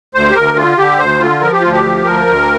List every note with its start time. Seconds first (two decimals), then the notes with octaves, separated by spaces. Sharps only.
0.14 D2 C5
0.30 G4
0.35 D2 A#4
0.57 D3 F4
0.78 D3 G4
0.99 D2 C5
1.20 D3 F4
1.41 F3 A#4
1.53 G4
1.62 D2 F4
1.72 G4
1.85 F3
2.05 D2 A#4
2.27 D2